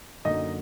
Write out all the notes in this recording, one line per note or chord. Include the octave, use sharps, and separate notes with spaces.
F#2 D3 F#3 A#3 D#4 D#5